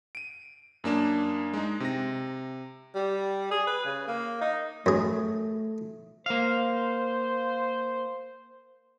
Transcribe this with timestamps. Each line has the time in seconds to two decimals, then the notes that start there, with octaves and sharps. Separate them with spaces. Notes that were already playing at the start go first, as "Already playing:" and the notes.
0.15 D7 D#7
0.84 F#2 A#3 D4 E7
1.54 G#3 D#4
1.80 C3 A#6
2.95 G3
3.51 G#4
3.67 B4
3.85 C#3
4.08 A#3
4.41 D#4
4.86 F#2 A3 G#4
6.26 A#3 C5 F5